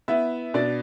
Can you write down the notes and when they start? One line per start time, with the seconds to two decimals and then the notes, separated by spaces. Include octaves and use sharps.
0.08 B3 E4 E5
0.54 B2 D4 D5